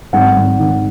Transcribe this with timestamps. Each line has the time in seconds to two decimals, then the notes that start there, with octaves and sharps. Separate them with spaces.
0.13 G#1 F#5
0.36 G#1
0.59 D#3